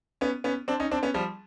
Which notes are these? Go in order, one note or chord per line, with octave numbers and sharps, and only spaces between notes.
B3 C#4
B3 C#4
C4 D4
C#4 D#4
C4 D4
B3 C#4
F3 G3